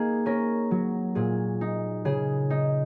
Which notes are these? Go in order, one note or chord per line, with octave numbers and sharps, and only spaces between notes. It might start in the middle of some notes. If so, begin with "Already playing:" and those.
Already playing: A#3 D#4 G#4
C#4 A#4
F#3
A#2 G#4
D#4
C#3 G#4
D#4